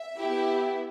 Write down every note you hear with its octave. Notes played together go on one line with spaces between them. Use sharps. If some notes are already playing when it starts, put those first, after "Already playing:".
Already playing: E5
B3 E4 G4